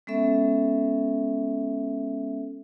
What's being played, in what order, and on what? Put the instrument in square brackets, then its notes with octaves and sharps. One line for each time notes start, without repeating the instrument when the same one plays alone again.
[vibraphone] G#3 B3 C#4 A4 E5